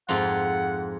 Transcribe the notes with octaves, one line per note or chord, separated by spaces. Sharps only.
F2 G#2 F4 F#5